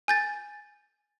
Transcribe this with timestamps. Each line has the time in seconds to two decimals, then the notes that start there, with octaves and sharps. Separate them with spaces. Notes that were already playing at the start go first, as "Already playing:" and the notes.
0.08 G#5 G6 A6